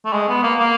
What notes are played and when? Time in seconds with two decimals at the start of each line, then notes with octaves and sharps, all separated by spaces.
0.06 A3
0.13 G#3
0.29 B3
0.43 A#3
0.59 A#3